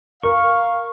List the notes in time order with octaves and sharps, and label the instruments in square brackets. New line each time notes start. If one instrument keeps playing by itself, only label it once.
[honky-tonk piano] A#4 [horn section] F5 [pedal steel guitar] C#6